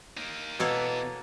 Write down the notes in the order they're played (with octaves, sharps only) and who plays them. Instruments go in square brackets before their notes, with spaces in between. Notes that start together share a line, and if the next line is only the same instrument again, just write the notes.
[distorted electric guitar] A#3 D#4
[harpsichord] B2 [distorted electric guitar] E3 B3 [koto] A#3 A4 C#5